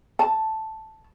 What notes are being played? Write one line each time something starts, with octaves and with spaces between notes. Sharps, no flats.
A5